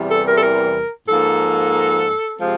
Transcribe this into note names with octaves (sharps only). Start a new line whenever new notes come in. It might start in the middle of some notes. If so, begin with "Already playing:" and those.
Already playing: E2 C3 E3 G3
A4
A#4
A4
A#4
G#2 F3 A#3 A4
C3 F3 G#3 C4